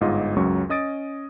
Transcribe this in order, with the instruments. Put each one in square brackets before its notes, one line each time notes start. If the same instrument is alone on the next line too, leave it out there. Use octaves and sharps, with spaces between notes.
[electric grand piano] G1 G#2 F4 D#5
C#2 F#2 F#3 C#6
C#4 D#5 D#6 A6 D7